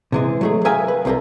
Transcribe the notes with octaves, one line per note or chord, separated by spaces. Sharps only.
C3 E3 G#3
F#3 A3 G#4
G#4 A#4 E5 F5 G5 G#5
B4
C2 C4 G4 A4 A#4